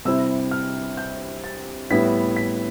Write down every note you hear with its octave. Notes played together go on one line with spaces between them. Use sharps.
C3 G3 C4 E4 E6
F6
G6
A6
A2 G3 B3 E4 B6
B6